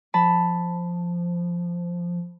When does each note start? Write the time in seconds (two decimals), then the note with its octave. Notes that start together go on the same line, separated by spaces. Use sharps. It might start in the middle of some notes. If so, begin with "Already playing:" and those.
0.14 F3 A5 B5